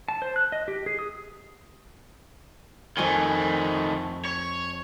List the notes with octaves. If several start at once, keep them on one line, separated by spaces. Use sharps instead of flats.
A5
C5
F#6
D#5
G4
G#4
D#6
F2 D#3 A3 G#5
C#5